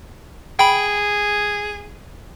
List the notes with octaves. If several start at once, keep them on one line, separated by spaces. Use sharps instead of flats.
G#4 G5 B5